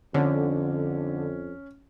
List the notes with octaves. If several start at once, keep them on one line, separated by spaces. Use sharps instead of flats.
F2 D3 C#4